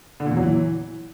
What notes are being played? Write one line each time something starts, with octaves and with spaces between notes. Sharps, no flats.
D3
A#2
E2
F#3
E3